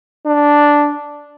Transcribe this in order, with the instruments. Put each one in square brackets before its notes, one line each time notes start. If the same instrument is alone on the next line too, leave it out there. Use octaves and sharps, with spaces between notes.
[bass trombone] D4